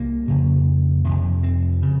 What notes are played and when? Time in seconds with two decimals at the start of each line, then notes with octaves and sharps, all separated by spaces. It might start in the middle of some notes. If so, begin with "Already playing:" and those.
Already playing: C2 C3 A#3
0.28 F2 C#3
1.04 F2 C3
1.43 C4
1.82 C#3